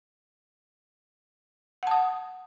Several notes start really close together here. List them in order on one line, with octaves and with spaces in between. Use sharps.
F#5 A5 D#6